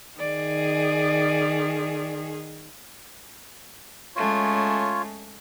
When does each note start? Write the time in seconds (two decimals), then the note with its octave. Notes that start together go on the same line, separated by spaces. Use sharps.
0.19 D#3 G#4 D5
4.16 G#3 A3 C#4 F4 C#5